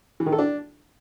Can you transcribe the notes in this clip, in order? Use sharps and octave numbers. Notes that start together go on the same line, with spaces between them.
E3
D#3
A4
D4